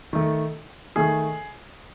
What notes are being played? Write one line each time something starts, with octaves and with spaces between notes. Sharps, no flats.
D#3 A3
D#3 A3 G#4